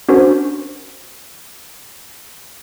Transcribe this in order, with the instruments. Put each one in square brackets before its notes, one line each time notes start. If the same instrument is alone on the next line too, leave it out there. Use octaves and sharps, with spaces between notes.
[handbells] C#4 D4 F#4 A#4 C5